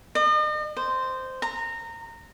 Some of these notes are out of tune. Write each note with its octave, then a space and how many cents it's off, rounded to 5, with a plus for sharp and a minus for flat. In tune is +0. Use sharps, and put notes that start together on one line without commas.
D#5 -40
C5 -10
A#5 -20